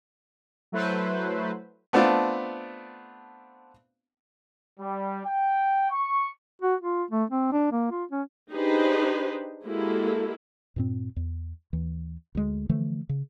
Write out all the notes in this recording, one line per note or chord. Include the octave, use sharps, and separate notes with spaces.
F#3 A3 E4 B4 C5
A3 B3 C4 D4 F4
G3
G5
C#6
F#4
F4
A3
C4
D4
A#3
F4
C#4
D4 D#4 G4 G#4 B4 C5
G#3 A#3 E4 F#4 G4 A4
G2 A#2 C4
E2
D#2 E3
D2 G#3
D3 E3 F3 A3
C#3